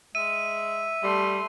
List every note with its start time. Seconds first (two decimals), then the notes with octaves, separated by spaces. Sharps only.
0.15 G#3 E5 D#7
1.03 G3 A3 C6